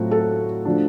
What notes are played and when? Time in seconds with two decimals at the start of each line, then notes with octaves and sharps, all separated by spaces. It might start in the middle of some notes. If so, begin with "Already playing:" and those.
Already playing: A2 F#3 A3 C4 F4 F#4
0.11 A4
0.65 F3 A3 D4